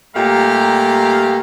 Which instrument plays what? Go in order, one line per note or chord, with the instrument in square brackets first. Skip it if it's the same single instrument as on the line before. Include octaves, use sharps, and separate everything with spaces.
[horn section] A#2 G3 A3 G4 F5 A#5